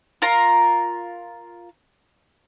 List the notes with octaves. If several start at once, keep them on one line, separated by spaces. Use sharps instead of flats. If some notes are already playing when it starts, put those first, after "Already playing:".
F4 A#4 A#5